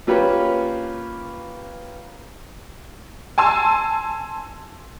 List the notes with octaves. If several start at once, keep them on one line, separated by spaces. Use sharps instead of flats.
A#3 C#4 F4 G4 B4 C#5
G#5 A5 C6 E6